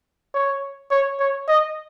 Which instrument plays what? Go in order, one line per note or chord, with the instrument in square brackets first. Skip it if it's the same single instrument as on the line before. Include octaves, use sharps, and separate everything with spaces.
[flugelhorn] C#5
C#5
C#5
D#5